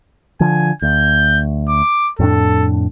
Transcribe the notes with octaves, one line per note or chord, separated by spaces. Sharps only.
D3 F3 G#5
D2 G6
D6
F2 A2 D4 A4